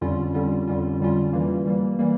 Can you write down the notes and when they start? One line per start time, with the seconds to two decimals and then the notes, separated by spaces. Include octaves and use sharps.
0.01 F2 D3 G3 C#4 F4
0.34 F2 D3 G3 C#4 F4
0.67 F2 D3 G3 C#4 F4
1.00 F2 D3 G3 C#4 F4
1.33 E3 G3 A#3
1.65 E3 G3 A#3
1.99 E3 G3 A#3